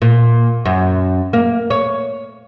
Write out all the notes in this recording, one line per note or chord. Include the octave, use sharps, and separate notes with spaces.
A#2
F#2
A#3
C#5